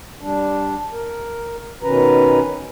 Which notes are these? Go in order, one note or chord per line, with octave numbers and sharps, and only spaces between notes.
G3 D4
A#4
B2 D#3 C#4 B4 A#5